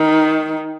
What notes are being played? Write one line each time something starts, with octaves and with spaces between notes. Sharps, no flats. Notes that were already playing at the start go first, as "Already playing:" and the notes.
Already playing: D#3